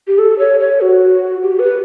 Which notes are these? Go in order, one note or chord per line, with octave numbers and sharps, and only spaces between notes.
G4
A4
C#5
C#5
F#4
G4
B4